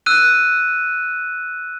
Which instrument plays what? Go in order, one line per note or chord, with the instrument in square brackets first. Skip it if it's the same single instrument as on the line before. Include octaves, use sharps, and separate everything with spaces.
[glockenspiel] E6 F#6 D#7